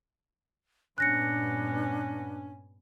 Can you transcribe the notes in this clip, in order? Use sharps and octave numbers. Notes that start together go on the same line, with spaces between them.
G2 A#2 B3 C#4 D4 F#6 A#6 C#7